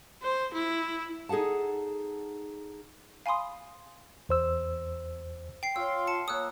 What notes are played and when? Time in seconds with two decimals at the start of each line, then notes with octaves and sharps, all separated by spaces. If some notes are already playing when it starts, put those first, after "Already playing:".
0.22 C5
0.54 E4
1.29 D#4 G#4 A4 F#5 A5
3.26 F5 G#5 B5 C6 D#6
4.29 E2 C5 E6
5.63 G5 C7
5.76 F4 C#5 F5 C6 E6
6.07 A5 C#7
6.28 A#3 C#5 D#6 E6 F#6